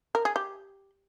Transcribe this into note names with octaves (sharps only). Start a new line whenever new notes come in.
A#4
G#4
G4